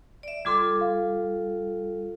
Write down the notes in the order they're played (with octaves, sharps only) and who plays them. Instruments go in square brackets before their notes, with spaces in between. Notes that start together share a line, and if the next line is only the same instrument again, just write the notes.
[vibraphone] D5 E5
[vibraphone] G3 F4 A4 [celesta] C6 D6 G#6
[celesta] F5